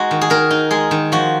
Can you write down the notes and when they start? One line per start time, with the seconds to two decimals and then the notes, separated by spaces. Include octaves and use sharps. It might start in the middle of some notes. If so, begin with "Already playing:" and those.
Already playing: G#3 D#4 F#4
0.11 D#3
0.21 G#4
0.30 D#3 A#4
0.50 D#4
0.71 G#3 G#4
0.91 D#3
1.12 F3 F#4